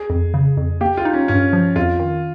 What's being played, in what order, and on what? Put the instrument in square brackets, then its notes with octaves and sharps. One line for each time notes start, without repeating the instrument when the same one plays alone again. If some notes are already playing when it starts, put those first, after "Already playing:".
Already playing: [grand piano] G#4
[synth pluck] F2
C#3
F2
[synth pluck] A#3 [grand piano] G4
[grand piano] F4
[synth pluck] D#4
[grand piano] C#4
[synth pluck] G2 [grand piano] C#4
[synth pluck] F3
[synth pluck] F2 [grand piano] F4
[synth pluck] D#3